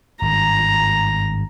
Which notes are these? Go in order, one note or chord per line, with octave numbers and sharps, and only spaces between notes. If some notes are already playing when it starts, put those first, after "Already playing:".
G#1 G2 A#5